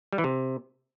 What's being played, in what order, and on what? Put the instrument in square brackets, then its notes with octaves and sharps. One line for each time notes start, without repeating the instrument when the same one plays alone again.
[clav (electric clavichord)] G3
E3
C3